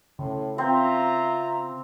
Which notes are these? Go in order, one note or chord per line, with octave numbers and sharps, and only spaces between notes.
A2 C#3
C4 F4 E5 A#5